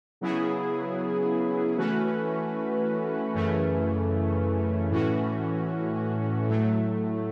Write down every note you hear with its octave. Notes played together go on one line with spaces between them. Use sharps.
C#3 F#3 B3 E4 G#4
E3 A3 C#4 F#4 B4
F#2 C#3 E3 A3 C#4
A2 E3 A3 C#4 F#4
A2 F#3 A3